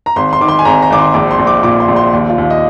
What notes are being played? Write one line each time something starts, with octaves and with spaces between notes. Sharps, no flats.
A#5
G#1 C6
C6
D#3 D6
C6
G#5
G#1 A#5
A#5
G#1 D6
C6
A#1 D6
C6
A#1
D6
A#2 D6
C6
A#1
C6
D#2
F4
D#2
D#5